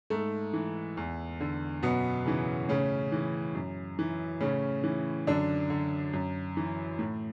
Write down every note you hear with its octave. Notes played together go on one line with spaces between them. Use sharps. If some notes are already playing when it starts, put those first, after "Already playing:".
G#2 A3
E3
E2
D3
F#2 B2 B3
C#3 E3
A2 C#3 C#4
E3
F#2
E3
A2 C#3 C#4
E3
F#2 D3 D4
D3
F#2
E3
A2